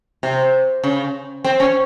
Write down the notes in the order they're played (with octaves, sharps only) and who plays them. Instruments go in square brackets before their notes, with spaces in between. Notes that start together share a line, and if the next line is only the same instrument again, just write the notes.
[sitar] C3
C#3
C4
C#4